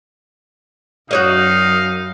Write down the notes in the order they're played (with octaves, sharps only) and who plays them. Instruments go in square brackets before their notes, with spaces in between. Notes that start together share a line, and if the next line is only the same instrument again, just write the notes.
[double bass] F#2 [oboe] D#4 [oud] F#4 C#5 D#5 [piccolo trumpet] F5